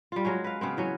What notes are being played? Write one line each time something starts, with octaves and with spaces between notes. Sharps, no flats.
G3 F4
F#3 G#3 C#4
B4 F5
C#3 B3 C4
E3 F#3 C#4